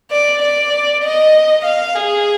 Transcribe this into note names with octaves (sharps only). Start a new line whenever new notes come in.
D5
D5
D#5
F5
G#4